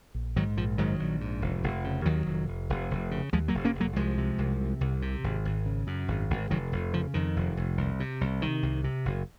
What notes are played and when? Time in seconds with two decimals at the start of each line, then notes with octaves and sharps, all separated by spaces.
0.14 A#1
0.36 G#2 D#3 F#3
0.57 A#1 F3
0.78 G#2 D#3 F#3
0.99 A#1
1.21 G#2
1.42 F1
1.63 F1
1.84 C#3
2.05 D#2 D#3 F#3
2.26 F1
2.48 F1
2.70 F1
2.90 F1
3.11 C#3
3.33 D#2 F3 G#3
3.48 F#3 A#3
3.55 F1
3.65 A#3 C#4
3.75 F1
3.80 F#3 A#3
3.96 C2 F3 G#3
4.18 C3
4.38 C2
4.60 C3
4.81 C2
5.02 C3
5.24 G#1
5.45 G#1
5.66 C#3
5.87 F#2
6.08 G#1
6.30 G#1
6.50 F1 D#3 F#3
6.72 F1
6.93 C#3 F3
7.14 F2 D#3
7.36 F1
7.57 F1
7.78 C2
8.00 C3
8.21 C2
8.41 C3 D#3
8.63 C2
8.84 C3
9.05 F#1